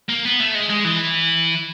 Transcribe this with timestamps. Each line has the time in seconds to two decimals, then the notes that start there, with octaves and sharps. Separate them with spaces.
0.09 A#3
0.25 B3
0.40 A3
0.55 G#3
0.70 G#3
0.84 E3